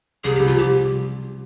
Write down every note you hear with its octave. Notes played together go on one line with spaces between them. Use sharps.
C2 G#4
C2 G4
F4
G4